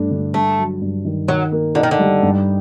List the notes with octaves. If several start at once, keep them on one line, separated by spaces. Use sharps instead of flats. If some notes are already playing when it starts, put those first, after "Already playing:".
Already playing: G2 A3 D4
D3
G2 A3
F#3
G2
D#3
D#3 F#3
A#3
D3 D#4
D#3
D3
G3
G2